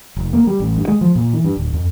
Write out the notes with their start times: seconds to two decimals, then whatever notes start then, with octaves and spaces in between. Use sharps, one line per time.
0.17 F1
0.33 A#3
0.47 G3
0.60 A1
0.77 G2
0.88 G#3
1.01 F3
1.16 A#2
1.33 E3
1.45 G2
1.57 D1
1.73 F2